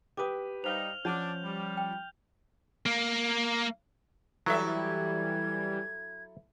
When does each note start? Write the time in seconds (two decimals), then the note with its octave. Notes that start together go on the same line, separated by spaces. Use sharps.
0.17 G4 B4 G5 D6 D#6
0.64 G3 D#4 C5 F5 F6 F7
1.05 F3 C#4 D4 D5 F#5 A5 F6 G6
1.43 G3
1.77 G5
2.86 A#3
4.46 E3 F#3 G3 E4 A4 E5
4.79 G#6